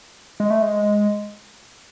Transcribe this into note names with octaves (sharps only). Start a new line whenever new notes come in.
G#3
A3
G#3